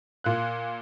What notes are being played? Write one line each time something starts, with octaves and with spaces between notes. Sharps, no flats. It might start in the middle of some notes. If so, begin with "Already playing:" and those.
A#2 F4 F#6